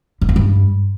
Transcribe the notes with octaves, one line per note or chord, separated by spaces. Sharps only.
F#2
E2
G2